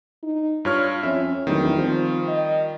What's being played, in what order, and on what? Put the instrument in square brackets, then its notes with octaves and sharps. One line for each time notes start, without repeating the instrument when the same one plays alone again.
[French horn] D#4
[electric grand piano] G2 C#5 F6 [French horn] F4
[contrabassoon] F2 [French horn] C#4 [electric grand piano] E5
[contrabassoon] D1 [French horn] E2 [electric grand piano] D#3 G3
[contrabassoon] F3 [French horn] C4
[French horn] D#5